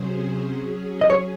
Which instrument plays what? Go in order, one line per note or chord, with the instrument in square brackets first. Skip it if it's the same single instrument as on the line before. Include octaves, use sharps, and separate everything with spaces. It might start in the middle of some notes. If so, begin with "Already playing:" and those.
Already playing: [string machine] C3 F#3 C#4 G#4 C5
F#3 C#4 G#4
[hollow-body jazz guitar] D#5
C#5